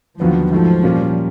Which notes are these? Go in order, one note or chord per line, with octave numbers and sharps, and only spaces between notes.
D#2 D3 F3 F#3 B3
G#2 D#3 F3 F#3 A3
A#2 G3 A#3 C#4